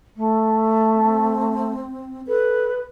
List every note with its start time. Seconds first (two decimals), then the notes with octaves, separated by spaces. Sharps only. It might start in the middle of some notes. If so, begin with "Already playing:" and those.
0.16 A3
0.94 C4
2.27 A4 B4